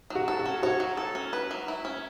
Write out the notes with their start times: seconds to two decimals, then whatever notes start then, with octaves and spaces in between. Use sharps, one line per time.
0.10 F#3 F#4
0.28 A4
0.39 F#4
0.46 C#4
0.63 F#4 C#5
0.80 F#3
0.97 A4
1.15 C#4
1.33 B4
1.51 F#3
1.68 E4
1.85 C#4